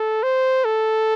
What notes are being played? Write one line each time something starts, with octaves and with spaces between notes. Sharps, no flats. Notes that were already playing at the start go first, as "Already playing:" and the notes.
Already playing: A4
C5
A4